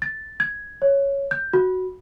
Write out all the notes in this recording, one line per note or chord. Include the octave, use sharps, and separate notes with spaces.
A6
G#6
C#5
G6
F#4